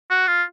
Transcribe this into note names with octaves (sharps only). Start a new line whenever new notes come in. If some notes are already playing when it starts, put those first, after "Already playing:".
F#4
F4